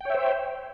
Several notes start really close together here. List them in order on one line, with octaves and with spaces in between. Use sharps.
G5 C#5 E5 C5